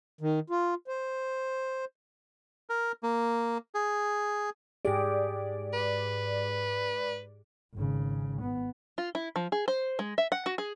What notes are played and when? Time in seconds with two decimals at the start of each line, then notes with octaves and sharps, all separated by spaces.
0.21 D#3
0.50 F4
0.88 C5
2.70 A#4
3.03 A#3
3.75 G#4
4.85 G#2 G4 G#4 D5
5.73 B4
7.74 G#1 C#3
8.41 B3
8.98 F4
9.15 E4
9.36 F3
9.52 G#4
9.68 C5
9.99 G#3
10.18 E5
10.32 F#5
10.46 F#4
10.58 G#4